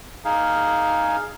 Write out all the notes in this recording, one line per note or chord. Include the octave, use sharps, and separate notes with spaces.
D#4 G#4 F5